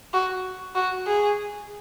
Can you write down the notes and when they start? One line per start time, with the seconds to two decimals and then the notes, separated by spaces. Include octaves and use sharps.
0.13 F#4
0.75 F#4
1.07 G#4